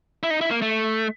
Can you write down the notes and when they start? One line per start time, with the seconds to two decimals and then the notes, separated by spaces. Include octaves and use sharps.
0.23 E4
0.30 D#4
0.41 E4
0.51 A#3
0.62 A3